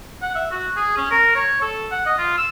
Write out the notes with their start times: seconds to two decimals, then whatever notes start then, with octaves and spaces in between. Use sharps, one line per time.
0.22 F#5
0.35 E5
0.51 F#4
0.76 G#4
0.97 C#4
1.11 A#4
1.35 C#5
1.62 A4
1.91 F#5
2.06 D#5
2.18 F4
2.38 E6